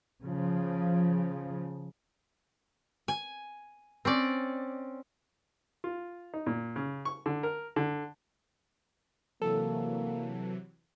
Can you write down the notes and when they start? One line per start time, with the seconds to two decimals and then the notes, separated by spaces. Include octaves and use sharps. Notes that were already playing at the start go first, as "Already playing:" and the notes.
0.22 C#3 F3
3.08 G#5
4.05 C4 C#4 D5
5.84 F4
6.34 D#4
6.46 A#2
6.76 C#3
7.05 C#6
7.26 D3
7.43 A#4
7.76 D3
9.42 C3 E3 F#3 A#3 A4